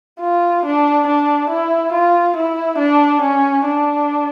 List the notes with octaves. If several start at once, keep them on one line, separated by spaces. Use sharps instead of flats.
F4
D4
D4
E4
F4
E4
D4
C#4
D4